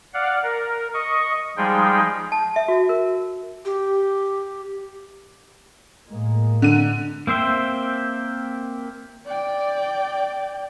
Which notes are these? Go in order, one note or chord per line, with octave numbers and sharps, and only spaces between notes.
D5 F5 F#5
A#4
D#5 C#6
F3 G3 G#3 D#4 G#4 G5
A5
E5
F#4
A#4
G4
A2 G#3 A#3
D3 D#7
A#3 C4 C5 E5 G5
D5 G5